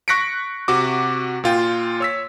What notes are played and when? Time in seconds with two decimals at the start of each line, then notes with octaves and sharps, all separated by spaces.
0.08 C#6 F#6 A#6 B6 C#7 D7
0.68 C3 F#4 D6
1.44 A#2 F4 G5
2.00 C#5 E6 B6